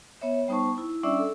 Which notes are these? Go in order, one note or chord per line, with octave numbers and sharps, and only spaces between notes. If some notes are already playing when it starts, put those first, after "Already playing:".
B3 C#5 E5
G3 B3 D#4 C5 A5 C#6
E4
G3 C#4 D4 D5 E5 E6
A4